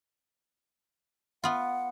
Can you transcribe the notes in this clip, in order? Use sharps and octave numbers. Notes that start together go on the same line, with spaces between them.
B3 F4 F#5